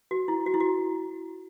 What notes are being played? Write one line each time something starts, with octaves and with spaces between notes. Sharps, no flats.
F#4
E4
F#4
E4
F#4